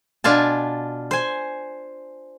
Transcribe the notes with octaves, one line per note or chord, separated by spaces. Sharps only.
B2 D4 F4 G#5 A5
C5 G#5